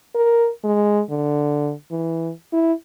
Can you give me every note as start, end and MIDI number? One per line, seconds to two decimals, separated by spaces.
0.15 0.49 70
0.64 1.01 56
1.10 1.72 50
1.91 2.31 52
2.53 2.73 64